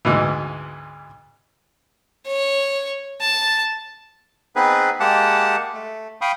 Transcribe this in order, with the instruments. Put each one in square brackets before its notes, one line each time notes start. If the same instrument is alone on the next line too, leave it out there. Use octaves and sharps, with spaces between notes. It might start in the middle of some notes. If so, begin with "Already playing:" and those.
[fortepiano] D2 G#2 B2 E3
[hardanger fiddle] C#5
A5
[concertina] B3 C4 D#4 G#4 B4
G#3 A#3 G4 F#5 A5
A3
F5 G5 B5 C#6 D#6